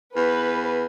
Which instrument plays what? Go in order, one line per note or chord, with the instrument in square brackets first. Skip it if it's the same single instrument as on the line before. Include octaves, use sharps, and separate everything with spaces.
[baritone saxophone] E2 [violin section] B4